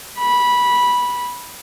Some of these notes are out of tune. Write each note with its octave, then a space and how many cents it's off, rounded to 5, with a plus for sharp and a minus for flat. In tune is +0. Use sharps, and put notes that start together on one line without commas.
B5 -15